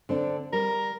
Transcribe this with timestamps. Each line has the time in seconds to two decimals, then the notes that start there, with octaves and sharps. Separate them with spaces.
0.09 D3 C4 D4
0.53 G3 A#4